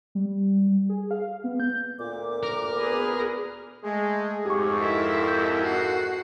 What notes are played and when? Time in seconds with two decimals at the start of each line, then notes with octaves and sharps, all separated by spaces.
0.15 G3
0.89 G#4
1.11 F5
1.44 B3
1.60 G6
1.99 D2 A#2 D6
2.43 A#4
2.76 B3 G#4 B4
3.82 G#3 A3 G#4
4.46 F2 G#2 G4 C#6
4.80 E4 A#4 E5
5.28 G6
5.62 F#4 C7